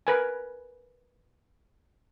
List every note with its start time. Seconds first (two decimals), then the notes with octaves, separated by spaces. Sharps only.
0.07 A#4 B4 G#5